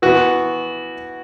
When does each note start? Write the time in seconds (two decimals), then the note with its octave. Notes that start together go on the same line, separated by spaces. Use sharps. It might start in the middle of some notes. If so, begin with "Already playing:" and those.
0.02 E3 B3 F#4